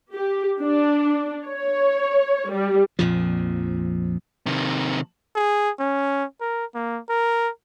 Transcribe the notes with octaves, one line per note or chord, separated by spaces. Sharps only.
G4
D4
C#5
G3
A#1 F2 A#2 F3
C3 D#3
G#4
C#4
A#4
A#3
A#4